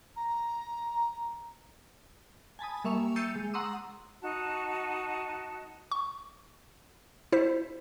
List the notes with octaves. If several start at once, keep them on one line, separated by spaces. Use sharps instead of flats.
A#5
G#5 A5 B5 D#6
G3 A#3 E5 C#6 F7
E6 G6 A6 C7 C#7 D#7
G#3
F#5 A#5 C6 C#6 D#6 E6
D#4 F#4 A5
C#6
E4 C5 B6